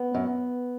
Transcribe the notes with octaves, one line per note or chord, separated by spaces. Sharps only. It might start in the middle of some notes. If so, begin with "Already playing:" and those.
Already playing: B3
F#2